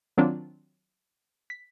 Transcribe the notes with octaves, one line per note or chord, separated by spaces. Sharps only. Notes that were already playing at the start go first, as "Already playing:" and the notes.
D#3 F#3 C4 D4 F4 D5
B6